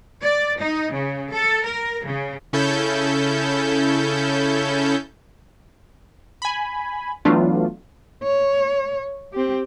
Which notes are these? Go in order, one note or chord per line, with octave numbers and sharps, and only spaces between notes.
D5
D#4
C#3
A4
A#4
C#3
C#3 C#4 E4 A4 G6
G#5 B5
E3 F#3 A3 B3 D4 F4
C#5
C4 G4